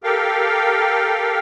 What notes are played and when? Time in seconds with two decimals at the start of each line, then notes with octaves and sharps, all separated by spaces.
0.04 G4 A4 A#4 F5 G5